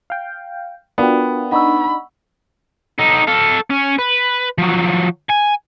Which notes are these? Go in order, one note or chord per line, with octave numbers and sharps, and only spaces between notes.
F5 G5
B3 D4 F4 F#4 A#4 F#5 G5
D4 D#4 F#5 B5 C#6 E6
D#4 A4
A4 F5
C#4
B4
F3 F#3
G#5